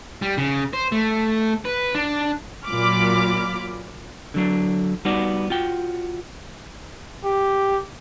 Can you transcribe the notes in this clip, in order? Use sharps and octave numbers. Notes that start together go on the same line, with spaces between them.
G3
C#3
C5
A3
B4
D4
A#2 F#3 F4 B5 D6 F6
D3 F#3 D4
G3 B3 D#4 F#4 D5
F4 F#4 G5
G4